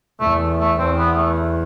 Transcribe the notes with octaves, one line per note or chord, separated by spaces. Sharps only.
E2 A3
A3
E2 C4
B3
A3